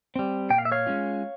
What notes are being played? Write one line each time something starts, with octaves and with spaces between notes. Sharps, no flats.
G3 C4
A#2 G5
F5
E5
C#5 F5
G#3 C#4 F4